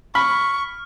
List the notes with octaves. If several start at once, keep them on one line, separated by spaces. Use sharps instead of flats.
B5 C#6 F6